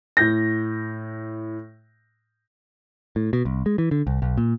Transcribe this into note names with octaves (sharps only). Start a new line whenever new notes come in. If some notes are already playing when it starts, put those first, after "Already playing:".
A2 G6 A#6
A2
B2
C2
G#3
E3
D3
C2
B1
A#2